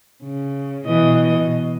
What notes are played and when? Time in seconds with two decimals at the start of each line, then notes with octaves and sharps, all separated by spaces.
0.23 C#3
0.85 B2 E3 D#5
1.31 B2